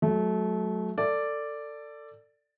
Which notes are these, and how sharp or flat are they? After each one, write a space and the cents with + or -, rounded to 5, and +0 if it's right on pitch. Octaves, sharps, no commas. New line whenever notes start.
F#3 +0 A3 -25
A4 +25 D5 +0